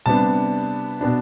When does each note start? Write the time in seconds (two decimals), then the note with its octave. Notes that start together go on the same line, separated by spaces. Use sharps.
0.06 C3 G3 B3 D4 A5
1.01 B2 B3 D4